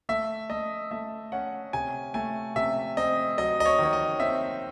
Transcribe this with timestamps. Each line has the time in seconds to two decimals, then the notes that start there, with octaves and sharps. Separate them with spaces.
0.09 A3 E5
0.50 A3 D#5
0.91 A3 E5
1.32 C#4 F#5
1.73 C3 G#5
2.14 A3 G#5
2.56 C3 E5
2.97 C4 D#5
3.38 F#3 D#5
3.60 D#5
3.65 C#5
3.79 D#3 C#5
3.93 D#5
4.20 C4 E5